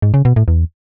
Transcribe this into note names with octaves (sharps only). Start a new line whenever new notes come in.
G#2
C#3
B2
A2
E2